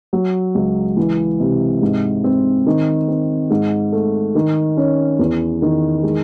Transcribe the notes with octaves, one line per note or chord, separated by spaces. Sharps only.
F#3
C#2
E3
C3
G#2
C4
D#3
C4
G#2
A3
D#3
C#4
E2
D#3
G#3